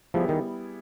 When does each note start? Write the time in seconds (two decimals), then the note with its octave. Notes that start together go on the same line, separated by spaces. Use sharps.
0.14 F3 G3 B3 E4 G#4
0.29 D#3